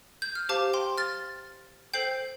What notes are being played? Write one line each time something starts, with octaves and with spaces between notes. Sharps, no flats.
G6
F6
G4 C5 F5 A5 D6
G5 C6
F6 A6
A4 C5 G5 G6 C7